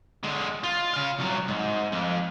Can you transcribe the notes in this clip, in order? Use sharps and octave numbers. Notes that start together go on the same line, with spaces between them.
D3 G#3
F4
C#3 F5
C2 F#3
G#2
F2